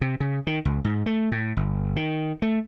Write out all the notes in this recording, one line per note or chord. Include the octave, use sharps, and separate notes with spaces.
C3
C#3
D#3
C#2
G#2
A3
A2
G1
D#3
A3